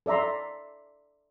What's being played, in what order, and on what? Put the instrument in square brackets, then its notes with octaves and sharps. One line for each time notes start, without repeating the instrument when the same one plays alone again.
[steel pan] A4 D5 E5 A#5 C6